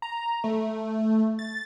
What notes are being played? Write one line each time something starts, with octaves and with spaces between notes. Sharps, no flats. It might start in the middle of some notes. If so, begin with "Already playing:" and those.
A#5
A3
A6